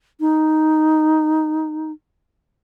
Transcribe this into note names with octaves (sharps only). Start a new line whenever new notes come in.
D#4